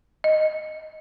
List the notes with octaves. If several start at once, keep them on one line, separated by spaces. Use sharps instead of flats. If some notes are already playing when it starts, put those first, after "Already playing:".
D#5